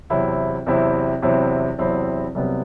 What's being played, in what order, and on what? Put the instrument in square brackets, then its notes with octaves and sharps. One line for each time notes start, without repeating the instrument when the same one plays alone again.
[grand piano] E2 C3 F#3 C4 E4
E2 C3 F#3 C4 E4
E2 C3 F#3 C4 E4
E2 C3 F#3 C4 E4
C2 C3 F#3 B3